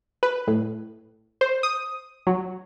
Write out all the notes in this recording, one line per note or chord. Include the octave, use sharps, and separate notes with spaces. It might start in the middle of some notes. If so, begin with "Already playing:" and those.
B4
A2
C5
D#6
F#3